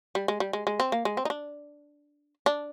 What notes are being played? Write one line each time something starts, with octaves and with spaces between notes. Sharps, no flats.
G3
G#3
G3
G#3
G#3
C4
A#3
G#3
C4
D#4
D4
D4